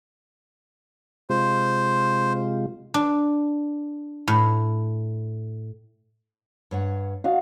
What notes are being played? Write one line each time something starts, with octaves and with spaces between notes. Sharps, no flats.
C3 G#3 F4 C5
D4
A2
G2 C#5 F#5
F#4 D#5 F5